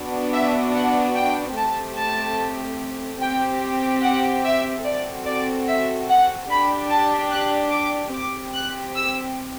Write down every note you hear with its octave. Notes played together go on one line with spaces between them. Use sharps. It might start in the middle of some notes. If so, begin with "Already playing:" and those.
Already playing: B3 D4 F#4
E5
F#5
G5
A3 C4 G4 A5
A5
C4 G4 G5
F#5
E5
C4 F#4 A4 D5
D5
E5
F#5
D4 G4 B5
A5
F#6
D6
C4 G4 D6
F#6
E6